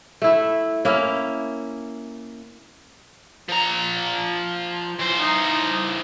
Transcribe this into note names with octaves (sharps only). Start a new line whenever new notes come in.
A3 E4
A#3 C#4 E4
F3 A#5
E3 C5
D#4